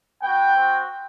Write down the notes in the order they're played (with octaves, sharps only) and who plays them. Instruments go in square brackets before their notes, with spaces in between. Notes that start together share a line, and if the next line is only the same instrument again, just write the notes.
[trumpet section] B3 F#4 G5
C4 F#4